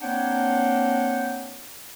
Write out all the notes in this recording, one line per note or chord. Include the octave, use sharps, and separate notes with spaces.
A#3 C4 D4 C#5 F#5 G5